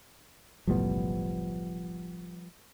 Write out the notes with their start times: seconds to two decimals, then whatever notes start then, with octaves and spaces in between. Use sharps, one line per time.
0.67 F#1 B1 A2 F3 G3 B3